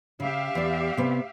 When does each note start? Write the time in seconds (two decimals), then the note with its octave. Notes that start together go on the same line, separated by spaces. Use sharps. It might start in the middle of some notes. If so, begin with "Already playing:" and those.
0.20 C#3 G4 E5 F5
0.55 E2 D5
0.97 C3 B3